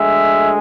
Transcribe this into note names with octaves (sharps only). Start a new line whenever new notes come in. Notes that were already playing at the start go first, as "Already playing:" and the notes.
Already playing: D2 D3 G#3 E5